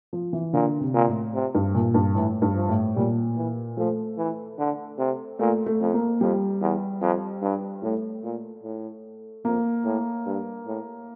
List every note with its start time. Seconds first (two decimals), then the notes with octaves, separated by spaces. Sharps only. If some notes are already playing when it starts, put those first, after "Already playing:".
0.13 F3
0.33 E3
0.53 A#2 D3
0.80 C3
0.94 A#2
1.08 A2
1.34 C3
1.55 G2
1.75 A#2
1.94 G2
2.15 A2 E3
2.42 G2
2.55 F3
2.69 A2
2.96 A#2 G3
3.36 E3
3.77 F3 A3
4.18 E3
4.59 D3
4.98 C3
5.39 A#2 A3
5.66 A3
5.81 F2
5.94 A#3
6.21 F2 G3
6.61 E2
7.01 F2
7.42 G2
7.83 A2 A3
8.24 A#2
8.64 A2
9.45 F2 A#3
9.85 A2
10.26 G2
10.67 A2